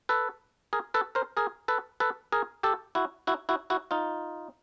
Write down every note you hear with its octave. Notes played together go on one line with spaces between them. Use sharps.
A4 B4
G#4 A#4
A4 B4
A#4 C5
G#4 A#4
A4 B4
A4 B4
G#4 A#4
G4 A4
E4 F#4
E4 F#4
E4 F#4
E4 F#4
D#4 F4